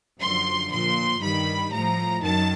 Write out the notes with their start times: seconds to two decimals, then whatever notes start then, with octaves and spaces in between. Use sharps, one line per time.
0.20 F#2 D3 F3 C6
0.70 A#2 F3 C6
1.21 G2 D#3 G3 B5
1.72 A2 F3 A#5
2.22 F#2 D#3 F#3 A5